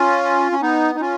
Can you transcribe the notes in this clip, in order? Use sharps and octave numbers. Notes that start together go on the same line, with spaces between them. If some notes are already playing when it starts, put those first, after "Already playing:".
Already playing: C#4 F4
C#4
B3 D#4
D#4
C#4 F4